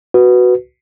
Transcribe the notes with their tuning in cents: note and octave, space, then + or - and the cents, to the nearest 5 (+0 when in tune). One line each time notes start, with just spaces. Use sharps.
F#4 +0 B4 +0